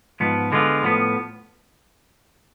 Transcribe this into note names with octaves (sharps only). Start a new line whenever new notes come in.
G#2 F3 B3
D3 G#3 B3 F4
A2 F3 B3